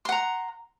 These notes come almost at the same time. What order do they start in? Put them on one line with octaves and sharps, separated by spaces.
C6 F#5 A#5